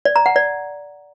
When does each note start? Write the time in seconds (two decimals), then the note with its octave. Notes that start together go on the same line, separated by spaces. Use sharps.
0.05 D5
0.16 A#5
0.26 F#5
0.36 D5